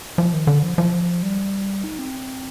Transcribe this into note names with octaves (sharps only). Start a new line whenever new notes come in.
F3
D#3
D3
F3
F3
G3
D#4
C4